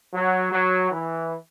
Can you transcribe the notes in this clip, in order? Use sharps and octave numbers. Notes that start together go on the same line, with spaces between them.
F#3
F#3
E3